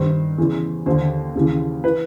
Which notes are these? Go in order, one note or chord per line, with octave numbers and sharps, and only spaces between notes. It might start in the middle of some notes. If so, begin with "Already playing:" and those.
Already playing: G2 D#3 C5
E2 C#3 E3
D#2 D3 C5
D#2 C#3 E3
E3 B4